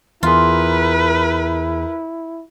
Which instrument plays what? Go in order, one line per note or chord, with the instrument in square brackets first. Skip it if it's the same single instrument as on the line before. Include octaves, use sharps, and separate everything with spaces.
[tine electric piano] E2 G#4 [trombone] E4 [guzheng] F4 [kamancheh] A#4 B4